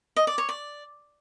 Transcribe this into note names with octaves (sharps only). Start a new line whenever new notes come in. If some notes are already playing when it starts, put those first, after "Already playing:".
D#5
D5
C#5
D5